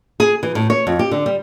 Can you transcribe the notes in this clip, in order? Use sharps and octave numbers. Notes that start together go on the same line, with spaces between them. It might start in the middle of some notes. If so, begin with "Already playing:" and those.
G#4
E3
A2
C#5
F2
G4
D3
G3